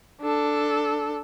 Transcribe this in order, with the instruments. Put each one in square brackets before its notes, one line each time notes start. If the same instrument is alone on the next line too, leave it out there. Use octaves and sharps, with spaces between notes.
[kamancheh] D4 A4